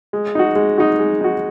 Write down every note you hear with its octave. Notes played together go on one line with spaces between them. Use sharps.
G#3
D#4 F#4
G#3
D#4 F#4
G#3
D#4 F#4